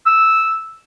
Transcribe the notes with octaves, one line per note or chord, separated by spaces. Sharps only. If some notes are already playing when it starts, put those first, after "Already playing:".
E6